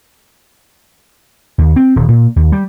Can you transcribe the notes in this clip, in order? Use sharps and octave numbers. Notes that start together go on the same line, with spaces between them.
D#2
C4
D#1
A#2
D#2
G3